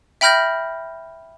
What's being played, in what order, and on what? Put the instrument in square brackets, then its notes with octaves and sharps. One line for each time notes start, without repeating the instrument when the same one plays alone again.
[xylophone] E5 G5 B5 F6 G6 A#6